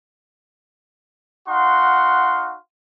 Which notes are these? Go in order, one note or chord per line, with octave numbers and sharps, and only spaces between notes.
D#4 F#4 F5 F#5 C6